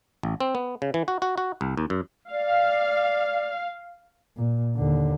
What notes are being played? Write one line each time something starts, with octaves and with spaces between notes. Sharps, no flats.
A1
C4
B3
C#3
E3
F#4
F#4
F#4
C2
D#2
F#2
D5 F5
A#2
D#2 D3